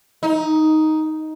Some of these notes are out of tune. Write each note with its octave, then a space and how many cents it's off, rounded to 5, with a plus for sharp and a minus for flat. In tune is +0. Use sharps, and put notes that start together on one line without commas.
D#4 +5